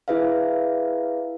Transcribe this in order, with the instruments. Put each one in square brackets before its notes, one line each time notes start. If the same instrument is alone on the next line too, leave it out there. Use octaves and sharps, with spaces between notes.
[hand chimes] E4 G#4 B4 E5 F5